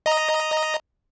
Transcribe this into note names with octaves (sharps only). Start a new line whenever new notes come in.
D#5 A#5